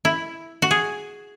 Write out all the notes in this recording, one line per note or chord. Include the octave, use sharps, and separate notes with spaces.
E4
F#4
G#4